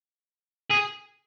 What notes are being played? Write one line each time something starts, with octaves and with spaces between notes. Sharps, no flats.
G#4